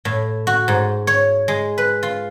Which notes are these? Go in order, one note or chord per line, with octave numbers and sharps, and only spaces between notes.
A2
F#4
G#2
C#5
G#3
B4
F4